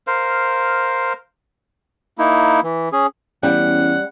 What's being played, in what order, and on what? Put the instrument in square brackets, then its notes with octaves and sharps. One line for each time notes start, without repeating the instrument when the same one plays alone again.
[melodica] A#4 C5 F5
[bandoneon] A#3 D#4 E4
E3
C#4 G#4
[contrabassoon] E2 [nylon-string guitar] G3 G5 [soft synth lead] C#4 [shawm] F#5